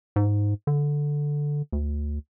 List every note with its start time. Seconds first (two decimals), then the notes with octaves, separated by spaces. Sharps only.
0.16 G#2
0.67 D3
1.72 D2